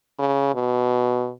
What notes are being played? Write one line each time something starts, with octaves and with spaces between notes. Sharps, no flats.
C#3
B2